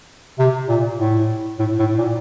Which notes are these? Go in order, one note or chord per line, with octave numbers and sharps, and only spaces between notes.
C3
A#2
A2
A2
A2
A#2